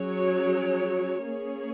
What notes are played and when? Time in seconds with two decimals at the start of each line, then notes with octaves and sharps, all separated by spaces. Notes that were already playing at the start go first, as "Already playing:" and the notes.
Already playing: F#3 C#4 G#4 C#5
1.25 A#3 C#4 G#4 C#5